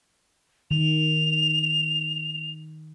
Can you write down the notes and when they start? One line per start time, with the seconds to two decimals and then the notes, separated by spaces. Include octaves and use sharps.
0.71 D#3 F7